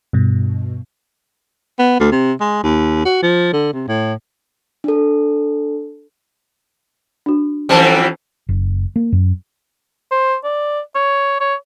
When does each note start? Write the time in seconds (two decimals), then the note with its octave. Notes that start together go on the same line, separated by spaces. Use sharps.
0.13 G2 B2
1.79 B3
2.00 D2
2.12 C3
2.41 G#3
2.63 D#2
3.05 F#4
3.22 F3
3.53 D3
3.73 C3
3.88 A2
4.84 D4 A4
7.26 D4 F#4
7.69 F2 E3 G3 C#4 C5 A5
8.49 F#1
8.96 A#3
9.12 F#2
10.11 C5
10.44 D5
10.95 C#5
11.40 C#5